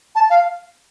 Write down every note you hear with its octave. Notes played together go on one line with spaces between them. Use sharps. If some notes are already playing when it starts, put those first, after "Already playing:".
A5
F5